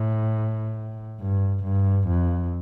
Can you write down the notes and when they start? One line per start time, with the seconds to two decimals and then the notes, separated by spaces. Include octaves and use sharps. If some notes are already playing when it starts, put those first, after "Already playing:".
Already playing: A2
1.21 G2
1.64 G2
2.08 F2